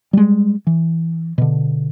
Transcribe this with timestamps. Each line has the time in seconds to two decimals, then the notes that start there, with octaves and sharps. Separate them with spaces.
0.13 G3 G#3
0.67 E3
1.38 B2 D3